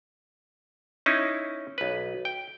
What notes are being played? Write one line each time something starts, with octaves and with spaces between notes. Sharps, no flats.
C#4 D#4 E4
B1 B4
G5